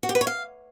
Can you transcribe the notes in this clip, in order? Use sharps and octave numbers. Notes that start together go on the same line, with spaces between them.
F#4
G4
B4
C#5
F5